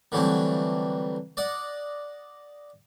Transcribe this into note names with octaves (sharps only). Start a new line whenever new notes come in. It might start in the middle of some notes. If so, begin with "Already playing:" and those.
D3 E3 F#3 G3 A3 C4
D5 D#5 F#5